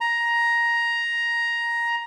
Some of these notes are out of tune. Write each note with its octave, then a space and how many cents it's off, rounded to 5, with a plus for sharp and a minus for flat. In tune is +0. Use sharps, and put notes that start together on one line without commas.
A#5 +10